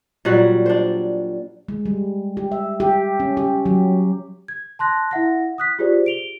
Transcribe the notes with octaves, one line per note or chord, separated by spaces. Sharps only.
A#2 F#3 G3 F#4
D4 C5
G#3
G3
G4
E5
G4
C#4
G4
F#3
G#6
A5 C6 F#6 A#6
E4 E5 F#5 A#6
D#6 F#6 B6
F4 G4 G#4 C5 D5
D7 F7 G7